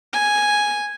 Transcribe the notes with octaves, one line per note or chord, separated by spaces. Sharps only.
G#5